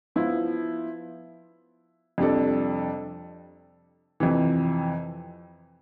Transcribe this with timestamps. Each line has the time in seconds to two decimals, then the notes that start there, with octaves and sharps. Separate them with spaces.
0.16 F3 B3 E4
2.18 F2 C3 G3 D4 A4
4.20 F2 C3 E3